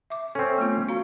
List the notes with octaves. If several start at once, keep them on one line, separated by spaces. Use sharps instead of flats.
E5 D6
C4 C#4 A4
A3 B3 F4
F#4 F5 A#5